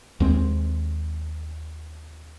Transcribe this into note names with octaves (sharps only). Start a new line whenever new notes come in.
D#2 G#3 C4